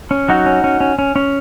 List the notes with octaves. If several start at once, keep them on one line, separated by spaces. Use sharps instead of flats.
C#4
F#3 D#4 F#4
C#4
C#4
C#4
C#4
C#4